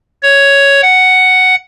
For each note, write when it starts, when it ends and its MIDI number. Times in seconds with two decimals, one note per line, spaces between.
0.23 0.81 73
0.82 1.55 78